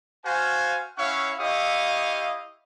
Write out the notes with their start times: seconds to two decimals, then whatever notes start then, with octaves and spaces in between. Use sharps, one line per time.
0.24 F#4 C5 F5 G#5
0.98 C#4 E4 C#5 F5 F#5 C#6
1.39 E4 G4 D#5 F5 C#6 D#6